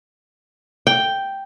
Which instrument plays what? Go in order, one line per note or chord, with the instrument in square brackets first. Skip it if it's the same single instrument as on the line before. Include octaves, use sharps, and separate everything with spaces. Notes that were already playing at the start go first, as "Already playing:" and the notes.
[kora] G5